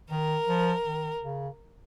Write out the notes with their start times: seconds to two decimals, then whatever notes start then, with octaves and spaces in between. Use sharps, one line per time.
0.10 D#3 A#4
0.48 F3
0.85 D#3
1.23 C#3